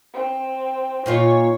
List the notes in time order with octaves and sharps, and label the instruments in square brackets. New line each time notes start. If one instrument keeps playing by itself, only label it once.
[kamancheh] C4
[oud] A#2 D#4 F4 [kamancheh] C#5